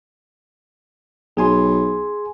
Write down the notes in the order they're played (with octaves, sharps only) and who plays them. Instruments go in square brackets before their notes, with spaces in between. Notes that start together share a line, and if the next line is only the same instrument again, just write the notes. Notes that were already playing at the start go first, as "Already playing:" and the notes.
[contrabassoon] B1 [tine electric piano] G#4 G#5 C6